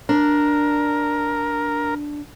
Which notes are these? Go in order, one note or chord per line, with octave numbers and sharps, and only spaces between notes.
D4 A#4